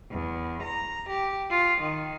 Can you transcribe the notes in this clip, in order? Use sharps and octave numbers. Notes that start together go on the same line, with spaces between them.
E2
A#5
G4
F4
D#3